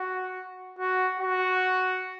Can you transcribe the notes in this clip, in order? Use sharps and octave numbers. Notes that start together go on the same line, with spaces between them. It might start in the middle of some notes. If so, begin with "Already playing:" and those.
Already playing: F#4
F#4
F#4